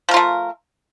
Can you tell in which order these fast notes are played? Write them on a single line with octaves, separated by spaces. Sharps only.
F3 A#4 F4 A3